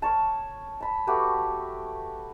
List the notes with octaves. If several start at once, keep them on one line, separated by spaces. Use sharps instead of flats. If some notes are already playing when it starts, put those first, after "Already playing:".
A#4 C#5 A5
A5 B5
A3 F#4 G4 B4